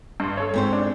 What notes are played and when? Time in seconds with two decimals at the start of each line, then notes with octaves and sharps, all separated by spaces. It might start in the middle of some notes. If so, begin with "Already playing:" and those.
0.20 G2 C6
0.37 A4 C#5
0.54 G#2 C4 C5
0.73 D4